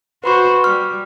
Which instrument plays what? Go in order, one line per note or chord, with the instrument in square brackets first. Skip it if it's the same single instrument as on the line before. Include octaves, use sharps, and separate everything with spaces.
[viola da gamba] F#4 C5 [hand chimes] B4 B5 C#6
[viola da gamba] G3 [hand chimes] F6